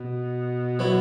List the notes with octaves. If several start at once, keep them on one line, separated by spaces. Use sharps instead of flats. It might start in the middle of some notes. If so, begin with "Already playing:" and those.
Already playing: B2
F#3 B3 E4